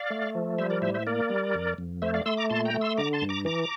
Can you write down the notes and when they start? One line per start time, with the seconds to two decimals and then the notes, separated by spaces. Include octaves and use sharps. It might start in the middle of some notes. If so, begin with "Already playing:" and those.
Already playing: D5 F5
0.10 A3
0.35 F3
0.58 G3 C5 E5
0.70 A#4 D5
0.82 A2 C5 E5
0.94 C5 E5
1.07 A#3 A#4 D5
1.30 G3
1.55 F2
1.78 F2
2.02 A3 C5 E5
2.14 D5 F5
2.26 A3 C6 E6
2.37 A#5 D6
2.50 A#2 A5 C6
2.65 G5 A#5
2.74 A3
2.81 C6 E6
2.97 D3 A#5 D6
3.13 A5 C6
3.22 G2
3.29 A#5 D6
3.45 E3 A#5 D6